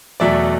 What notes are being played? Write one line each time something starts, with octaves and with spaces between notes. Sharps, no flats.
E2 B2 F#3 A3 D5 E5